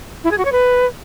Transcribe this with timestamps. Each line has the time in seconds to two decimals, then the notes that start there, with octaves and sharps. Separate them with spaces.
0.24 E4
0.31 G#4
0.38 F#4
0.45 C#5
0.52 B4